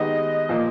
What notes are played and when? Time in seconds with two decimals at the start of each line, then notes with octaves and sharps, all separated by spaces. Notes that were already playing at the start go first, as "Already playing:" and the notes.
Already playing: D#3 G#3 B3 D#4 G4 D#5
0.49 A#2 F3 A#3